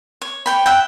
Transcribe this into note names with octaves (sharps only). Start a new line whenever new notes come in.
C#5
C#5 G5 B5
E5 F#5 G5